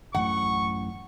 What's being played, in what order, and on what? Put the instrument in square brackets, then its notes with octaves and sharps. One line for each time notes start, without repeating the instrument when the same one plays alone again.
[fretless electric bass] A1 F#2 A2 [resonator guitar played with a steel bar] F#5 [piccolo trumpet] C#6